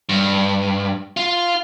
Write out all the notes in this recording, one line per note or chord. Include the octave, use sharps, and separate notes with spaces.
G2
F4